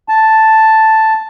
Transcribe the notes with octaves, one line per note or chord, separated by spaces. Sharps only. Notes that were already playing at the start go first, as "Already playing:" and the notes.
A5